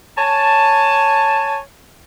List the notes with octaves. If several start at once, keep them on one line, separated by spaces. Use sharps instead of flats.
C#5 G#5 A5